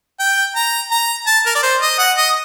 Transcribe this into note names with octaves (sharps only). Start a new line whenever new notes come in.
G5
A#5
A#5
A5
A#4
D5
C5
D#5
F#5
D#5